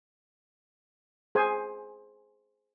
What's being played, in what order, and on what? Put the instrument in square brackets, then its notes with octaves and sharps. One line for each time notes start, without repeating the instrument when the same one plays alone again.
[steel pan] G#4 C5 G#5